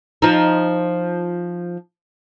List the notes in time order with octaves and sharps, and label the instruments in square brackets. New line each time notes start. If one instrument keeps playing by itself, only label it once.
[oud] F3 D#4